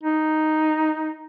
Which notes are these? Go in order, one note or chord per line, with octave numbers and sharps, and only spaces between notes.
D#4